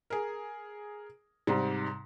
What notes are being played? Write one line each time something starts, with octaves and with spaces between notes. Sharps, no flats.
G#4 A#4
G#2 C3 G3